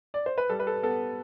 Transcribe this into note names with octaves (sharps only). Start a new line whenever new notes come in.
D5
C5
B4
G3 A4
B4
A4
B3 A4